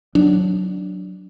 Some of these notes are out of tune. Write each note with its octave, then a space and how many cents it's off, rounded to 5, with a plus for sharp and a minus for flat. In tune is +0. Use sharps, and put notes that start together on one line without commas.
F#3 +0 D4 +0